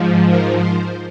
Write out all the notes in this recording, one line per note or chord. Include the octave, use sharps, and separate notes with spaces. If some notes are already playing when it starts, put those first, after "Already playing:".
Already playing: G#2 F3
A#4
C5